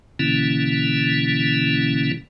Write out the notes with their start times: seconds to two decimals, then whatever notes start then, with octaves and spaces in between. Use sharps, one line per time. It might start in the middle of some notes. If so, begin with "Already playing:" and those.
0.19 B2 D3 E3 A#3 C#4 E4